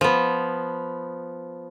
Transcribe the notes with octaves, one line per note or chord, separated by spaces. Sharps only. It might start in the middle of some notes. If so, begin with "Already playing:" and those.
F3 B3